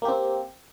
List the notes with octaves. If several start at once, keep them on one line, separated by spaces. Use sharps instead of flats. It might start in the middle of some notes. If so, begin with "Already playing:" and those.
A#3 C4 G4